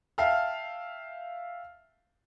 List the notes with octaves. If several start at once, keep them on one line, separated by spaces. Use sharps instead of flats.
E5 F5 G5 A5 F6